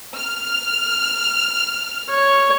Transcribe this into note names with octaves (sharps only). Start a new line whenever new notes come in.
F6
C#5